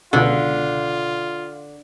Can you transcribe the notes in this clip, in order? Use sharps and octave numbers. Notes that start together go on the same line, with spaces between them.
C#2 B2 D3 F4